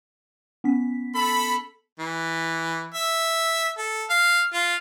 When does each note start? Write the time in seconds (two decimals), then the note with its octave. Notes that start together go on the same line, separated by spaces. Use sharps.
0.64 B3 C#4 B6
1.15 A4 B5
1.99 E3
2.94 E5
3.78 A4
4.10 F5
4.54 F4